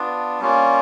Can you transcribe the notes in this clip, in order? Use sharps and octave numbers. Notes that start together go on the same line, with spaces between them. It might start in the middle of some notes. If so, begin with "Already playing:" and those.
Already playing: B3 D4 F4
G3 A#3 C#4 F4